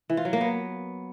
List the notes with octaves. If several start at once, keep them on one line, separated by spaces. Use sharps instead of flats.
E3
F4
F#3
A#3
B3